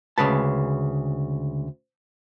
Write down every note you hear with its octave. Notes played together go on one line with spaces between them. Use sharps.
D2 C#3 G#3 B4 A5